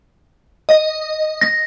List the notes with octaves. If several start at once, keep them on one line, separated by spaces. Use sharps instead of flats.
D#5
A#6